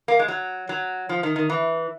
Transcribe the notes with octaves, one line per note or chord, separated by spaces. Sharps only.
A#3
G#3
F#3
F#3
F3
D#3
D#3
E3